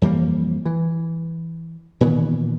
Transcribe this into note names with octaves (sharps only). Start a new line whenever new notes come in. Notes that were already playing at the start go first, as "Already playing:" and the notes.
F2 E3 G3 A#3
E3
A#2 D#3 E3 B3